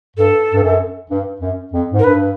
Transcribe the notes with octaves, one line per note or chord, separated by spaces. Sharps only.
G2 A4
G2
F#2
G2
F#2
F2
G#2
A#4
G2 B4